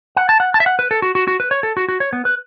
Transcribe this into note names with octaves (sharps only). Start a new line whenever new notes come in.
F#5
A5
F#5
A5
E5
F#5
B4
A4
F#4
F#4
F#4
B4
C#5
A4
F#4
F#4
C#5
B3
B4